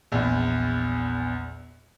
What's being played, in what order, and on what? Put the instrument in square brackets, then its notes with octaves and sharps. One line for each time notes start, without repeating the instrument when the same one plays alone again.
[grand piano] A#1 E2